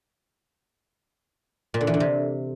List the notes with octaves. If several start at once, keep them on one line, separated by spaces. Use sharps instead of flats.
A#2
D3
E3
D3
C3